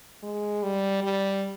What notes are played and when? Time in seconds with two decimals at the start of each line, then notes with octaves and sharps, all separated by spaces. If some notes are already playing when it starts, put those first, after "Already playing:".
0.23 G#3
0.63 G3
1.03 G3